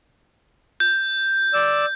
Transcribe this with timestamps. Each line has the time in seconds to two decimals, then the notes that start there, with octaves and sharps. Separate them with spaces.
0.80 G6
1.53 D5 E6